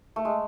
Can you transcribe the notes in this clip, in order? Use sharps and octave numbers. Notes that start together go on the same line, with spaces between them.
A3
G#3